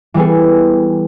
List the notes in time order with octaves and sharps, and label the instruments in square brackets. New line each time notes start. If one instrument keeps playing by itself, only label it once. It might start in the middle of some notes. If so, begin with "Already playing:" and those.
[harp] E3 G3 B3 G#4 A4